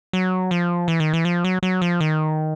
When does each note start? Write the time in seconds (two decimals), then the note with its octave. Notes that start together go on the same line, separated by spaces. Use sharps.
0.13 F#3
0.51 F3
0.88 E3
1.00 D#3
1.13 E3
1.25 F3
1.44 F#3
1.63 F#3
1.82 F3
2.00 D#3